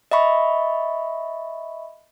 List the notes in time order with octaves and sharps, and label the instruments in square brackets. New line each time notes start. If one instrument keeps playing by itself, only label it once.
[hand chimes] D#5 E5 B5 C#6